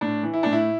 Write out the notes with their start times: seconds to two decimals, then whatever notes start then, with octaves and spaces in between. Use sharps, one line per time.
0.01 A2 D4
0.23 E3
0.33 E4
0.43 A2 D4
0.53 E4